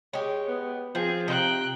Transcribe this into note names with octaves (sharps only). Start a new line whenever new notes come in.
G#3 G4 C#5
B3
F3 C4 G#4
C3 D#4 G5 A#5 F#6